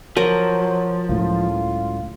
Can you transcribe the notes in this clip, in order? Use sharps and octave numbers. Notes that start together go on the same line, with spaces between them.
F3 F#3 A#4
C#2 A2 F#3 F4